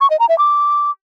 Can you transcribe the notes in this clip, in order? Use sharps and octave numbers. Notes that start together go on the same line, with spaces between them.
C#6
D#5
A#5
E5
D6